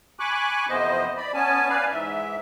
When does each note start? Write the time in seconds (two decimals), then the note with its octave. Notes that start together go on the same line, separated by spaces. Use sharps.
0.19 G#5 B5 C#6 D6 F#6
0.69 F2 C3 E3 B3 C5 D#5
1.17 D5 B5
1.34 B3 C#4 G#5 A5
1.69 B4 D5 F5 G#5
1.90 G#2 E3 E5